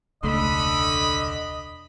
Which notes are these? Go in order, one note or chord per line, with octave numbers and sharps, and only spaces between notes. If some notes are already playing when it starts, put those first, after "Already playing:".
E1 C#2 D3 A3 D#5 B5